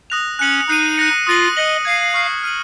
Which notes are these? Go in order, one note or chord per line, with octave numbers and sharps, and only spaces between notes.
D#6 F#6 A#6 F7
C#4 F#6 C#7 F#7
D#4 F#6 C7 D#7
F#6 A#6 C#7
F4 D#6 A#6 D#7 F#7
D#5 F#6 C#7 F#7
F5 G#6 C7 D#7
C#6 F6 C7 D#7
F6 C7 D#7 F#7